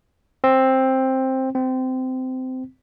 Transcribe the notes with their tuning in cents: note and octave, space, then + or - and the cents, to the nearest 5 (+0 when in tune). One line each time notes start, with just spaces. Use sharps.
C4 +10
C4 -20